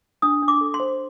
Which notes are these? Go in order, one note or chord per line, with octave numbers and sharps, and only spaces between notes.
D4 D#6
D4
D6
A4
C6
C5